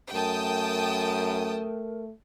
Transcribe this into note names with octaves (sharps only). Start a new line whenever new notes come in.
F#2 A3 A#4 G5 A5 D#6